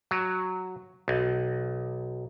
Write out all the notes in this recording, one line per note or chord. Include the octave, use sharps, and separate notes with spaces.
F#3
B1